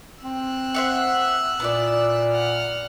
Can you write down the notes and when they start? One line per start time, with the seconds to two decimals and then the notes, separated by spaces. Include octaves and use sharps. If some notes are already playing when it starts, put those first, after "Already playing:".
0.24 C4 E6 F#6
0.75 C5 E5 F#5
1.60 A#2 B3 E4 D5
2.30 F#5 F6